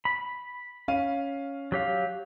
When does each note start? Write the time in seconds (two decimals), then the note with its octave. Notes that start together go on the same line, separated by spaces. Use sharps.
0.05 B5
0.88 C#4 F5 D#7
1.72 F#3 G4 F5